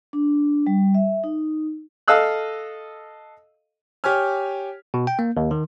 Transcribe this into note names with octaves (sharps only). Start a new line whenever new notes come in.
D4
G3
E5
D#4
A4 D#5 F5 E6 F#6
G4 C#5 G#5 F6
B2
G5
A#3
D#2
D#3